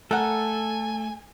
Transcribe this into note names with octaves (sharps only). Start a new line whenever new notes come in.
A3 A4 A#4 F#5 G#5